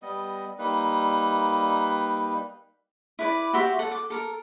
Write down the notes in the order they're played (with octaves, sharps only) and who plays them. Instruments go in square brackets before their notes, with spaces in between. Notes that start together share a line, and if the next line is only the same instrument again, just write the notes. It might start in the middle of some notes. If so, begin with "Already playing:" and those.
[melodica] G3 B3 D#5
G3 A#3 D#4 B4
[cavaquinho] E4 B4 D5
F#4 G4 C5 E5
A4 F#5
D6
A4 A#4